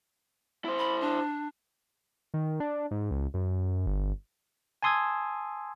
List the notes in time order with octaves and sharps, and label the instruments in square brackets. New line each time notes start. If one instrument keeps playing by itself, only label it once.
[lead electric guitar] E4 C5
[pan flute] B5
D4
[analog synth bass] D#3
D4
G#2
C#2
F#2
G1
[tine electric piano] G#5 A5 C6 D#6 E6 G#6